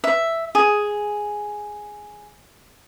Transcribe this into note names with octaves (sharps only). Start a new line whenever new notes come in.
E5
G#4